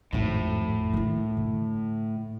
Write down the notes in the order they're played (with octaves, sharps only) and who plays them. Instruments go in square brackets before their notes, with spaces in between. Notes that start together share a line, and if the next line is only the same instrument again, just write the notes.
[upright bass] G#1 F2 [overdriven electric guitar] A2
[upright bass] D#3 E4
D3